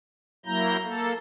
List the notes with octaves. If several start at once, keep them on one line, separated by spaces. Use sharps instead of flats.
F#3 A#3 E4 A#5 G6
A#3 A4